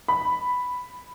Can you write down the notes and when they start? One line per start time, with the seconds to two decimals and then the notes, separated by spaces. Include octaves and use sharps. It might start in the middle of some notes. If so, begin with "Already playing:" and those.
0.08 B5